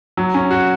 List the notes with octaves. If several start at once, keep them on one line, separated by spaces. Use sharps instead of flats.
F#3
C#4
F#4